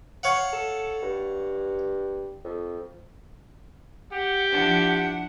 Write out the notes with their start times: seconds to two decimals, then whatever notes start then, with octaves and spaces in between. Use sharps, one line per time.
0.23 C#5 F5 F#5
0.53 A4
1.03 G2
2.44 F2
4.13 G4 F#5
4.51 F3 D4 E4 F#5